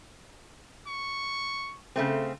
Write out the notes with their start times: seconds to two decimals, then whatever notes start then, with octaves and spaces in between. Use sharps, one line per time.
0.87 C#6
1.96 C#3 A3 C4